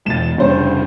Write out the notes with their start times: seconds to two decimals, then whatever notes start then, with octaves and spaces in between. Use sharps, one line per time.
0.06 E2 B2 G#3 A6 E7
0.38 F1 G2 C#3 C5